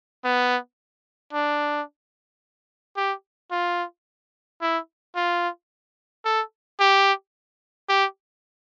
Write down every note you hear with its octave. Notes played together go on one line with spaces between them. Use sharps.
B3
D4
G4
F4
E4
F4
A4
G4
G4